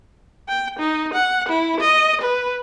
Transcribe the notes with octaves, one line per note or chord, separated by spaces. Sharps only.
G5
D#4
F#5
E4
D#5
B4